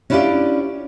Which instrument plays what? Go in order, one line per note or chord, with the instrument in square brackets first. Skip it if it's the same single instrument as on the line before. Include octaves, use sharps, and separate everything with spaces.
[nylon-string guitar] C#4 D4 E4 F4 G4 D5